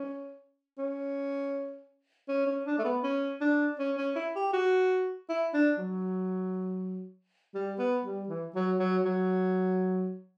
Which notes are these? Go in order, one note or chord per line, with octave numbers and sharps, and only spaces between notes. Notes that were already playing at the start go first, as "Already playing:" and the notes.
Already playing: C#4
C#4
C#4
C#4
D4
A3
B3
C#4
D4
C#4
C#4
E4
G4
F#4
E4
D4
F#3
G3
B3
G3
E3
F#3
F#3
F#3